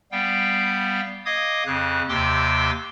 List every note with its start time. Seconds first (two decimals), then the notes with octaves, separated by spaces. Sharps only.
0.12 G3 B3 F5 G5
1.26 D#5 F5 D6 D#6 G#6
1.66 F2 C#3 F#6
2.09 D#2 C3 G5 C6 D6 E6